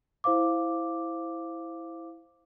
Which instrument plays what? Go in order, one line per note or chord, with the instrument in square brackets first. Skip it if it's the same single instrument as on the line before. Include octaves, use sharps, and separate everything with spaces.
[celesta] E4 C5 F5 D6